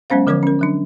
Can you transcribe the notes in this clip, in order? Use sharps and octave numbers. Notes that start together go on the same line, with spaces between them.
F#3 G#3 B3 C#4 C5 F5
D3 F3 A#4 C#5 D6 G#6
C#4 A#4
D3 F#3 D4